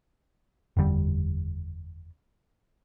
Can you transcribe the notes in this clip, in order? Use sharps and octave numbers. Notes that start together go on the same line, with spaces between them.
F#1 E2 D3 G3